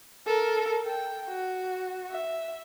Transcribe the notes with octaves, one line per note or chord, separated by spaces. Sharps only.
A4 A#4
G5
F#4
E5